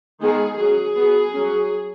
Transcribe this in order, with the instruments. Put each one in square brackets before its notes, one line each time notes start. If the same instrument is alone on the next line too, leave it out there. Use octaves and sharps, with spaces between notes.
[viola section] D#3 G#3 B3 G#4
F#3 C#4 G#4
F#3 B3
F#3 C#4